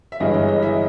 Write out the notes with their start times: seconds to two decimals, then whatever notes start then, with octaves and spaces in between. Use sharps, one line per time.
0.12 E5
0.20 G1 G2 E3 G#3 D#5
0.34 D#5
0.48 D#5
0.62 E3 G#3 E5